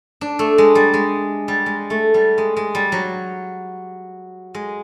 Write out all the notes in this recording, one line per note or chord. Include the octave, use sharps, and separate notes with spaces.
D4
A3
G#3
G3
G#3
G3
G#3
A3
G3
G#3
G#3
G3
F#3
G#3